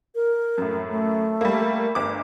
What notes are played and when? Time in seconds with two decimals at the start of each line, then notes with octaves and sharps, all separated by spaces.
0.15 A#4
0.58 F#2 A2
0.90 A3
1.41 G3 A#3
1.95 G1 D6